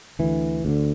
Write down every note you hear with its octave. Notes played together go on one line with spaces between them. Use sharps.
D2 D3 E3
D2 D3